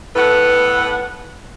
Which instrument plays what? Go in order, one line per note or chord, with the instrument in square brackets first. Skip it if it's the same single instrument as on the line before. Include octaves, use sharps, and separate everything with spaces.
[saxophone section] A2 B3 A4 B4 F#5